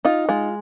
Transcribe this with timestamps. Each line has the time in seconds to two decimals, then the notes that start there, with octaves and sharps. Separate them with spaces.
0.05 D#4 F4
0.29 G#3 F4